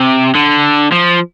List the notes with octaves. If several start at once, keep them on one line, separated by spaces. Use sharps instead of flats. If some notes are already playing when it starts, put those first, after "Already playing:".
Already playing: C3
D3
F3